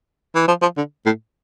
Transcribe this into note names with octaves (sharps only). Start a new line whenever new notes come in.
E3
F3
F3
D3
A2